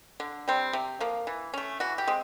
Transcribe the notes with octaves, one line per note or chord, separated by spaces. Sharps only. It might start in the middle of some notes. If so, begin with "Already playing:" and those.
D3
G3 C4
C3
F3 A#3
E3
A3 C#4
E3 F#4
G4
G#3 C4